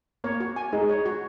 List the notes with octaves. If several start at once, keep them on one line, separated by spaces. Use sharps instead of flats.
A#3 C#5
F#4
G#5
G#3 D#4
C#5
F#4